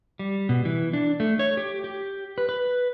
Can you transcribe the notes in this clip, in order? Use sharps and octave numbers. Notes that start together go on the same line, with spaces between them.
G3
B2
E3
D4
A3
C#5
G4
G4
B4
B4